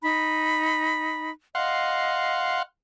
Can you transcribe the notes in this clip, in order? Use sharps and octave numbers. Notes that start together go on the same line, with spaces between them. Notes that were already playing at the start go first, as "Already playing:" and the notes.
D#4 B5
D#5 F5 F#5 C6